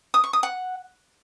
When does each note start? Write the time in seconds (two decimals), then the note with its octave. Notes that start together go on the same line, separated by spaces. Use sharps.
0.14 D#6
0.24 C#6
0.33 D#6
0.43 F#5